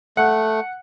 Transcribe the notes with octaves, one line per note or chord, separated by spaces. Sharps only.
A3 F#5